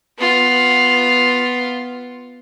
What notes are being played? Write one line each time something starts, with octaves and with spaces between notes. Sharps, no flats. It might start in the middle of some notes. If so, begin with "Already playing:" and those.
B3 F4